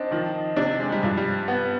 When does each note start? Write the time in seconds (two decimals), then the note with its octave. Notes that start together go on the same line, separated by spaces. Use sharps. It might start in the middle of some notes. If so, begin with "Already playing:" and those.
Already playing: C4 D4 D#4
0.11 D#3 F3
0.56 C3 D4
0.80 G#3
0.92 G3
1.03 G2 F3
1.17 G3
1.48 B3